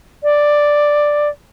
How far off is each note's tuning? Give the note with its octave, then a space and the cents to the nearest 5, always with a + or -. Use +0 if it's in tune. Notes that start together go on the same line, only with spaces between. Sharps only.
D5 +5